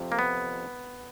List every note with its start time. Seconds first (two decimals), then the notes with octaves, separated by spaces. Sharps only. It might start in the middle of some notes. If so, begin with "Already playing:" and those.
Already playing: F2 C3
0.12 A#3
0.19 B3